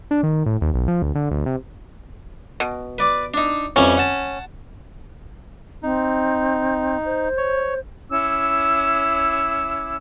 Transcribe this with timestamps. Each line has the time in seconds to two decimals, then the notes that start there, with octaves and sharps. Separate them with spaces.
0.11 D4
0.23 D#3
0.46 A2
0.61 D#2
0.74 B1
0.88 F3
1.02 D2
1.15 D3
1.31 D2
1.46 C3
2.60 B2
2.98 B4 D5 D6
3.34 D4 D#4
3.76 F2 E3 G3 C#4
3.97 F#5 A5
5.83 C4 D#4
7.05 C5
7.37 C#5
8.10 C#4 E4 D6 E6